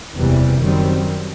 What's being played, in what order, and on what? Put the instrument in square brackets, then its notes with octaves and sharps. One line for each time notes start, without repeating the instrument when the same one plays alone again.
[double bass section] F#1 E2 C3 E3 G3
F#2 D#3 G3 C4